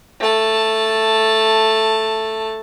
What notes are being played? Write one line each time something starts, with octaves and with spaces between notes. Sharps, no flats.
A3 A5